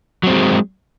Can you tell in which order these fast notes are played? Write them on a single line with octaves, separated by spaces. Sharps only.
F#3 C4 G#3